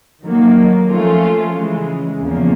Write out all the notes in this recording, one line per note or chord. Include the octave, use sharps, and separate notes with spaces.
D#3 F#3 A#3
F3 A3 C#4 F4
C#3 E3 G#3
E2 C#3 F3 A#3